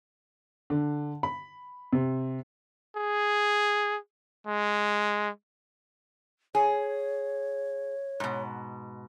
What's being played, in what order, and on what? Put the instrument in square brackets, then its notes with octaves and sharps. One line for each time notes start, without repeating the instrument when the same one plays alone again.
[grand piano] D3
B5
C3
[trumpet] G#4
G#3
[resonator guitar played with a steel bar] G#4 [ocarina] C#5
[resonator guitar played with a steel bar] G#2 B2